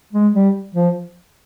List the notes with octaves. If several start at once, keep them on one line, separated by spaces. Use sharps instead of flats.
G#3
G3
F3